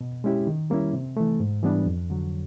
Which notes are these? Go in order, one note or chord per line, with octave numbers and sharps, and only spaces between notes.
B2
G#3 C#4 E4 G4
D#3
G3 A#3 C#4 E4
C3
E3 A3
G#2
E3 G3 B3 D4
F2
D3 F#3